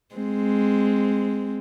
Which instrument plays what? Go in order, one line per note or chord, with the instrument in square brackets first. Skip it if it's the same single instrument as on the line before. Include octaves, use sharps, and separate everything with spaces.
[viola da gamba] G#3 C4